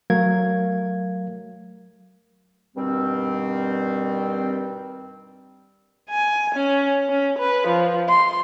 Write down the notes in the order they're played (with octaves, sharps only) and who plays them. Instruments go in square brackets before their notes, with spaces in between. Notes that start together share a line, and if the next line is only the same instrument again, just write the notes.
[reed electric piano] F#3 A3 A#4 F5 G#6
[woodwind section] G2 B2 D#3 G3 C4
[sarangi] G#5
C#4
C#4
B4
F3
C6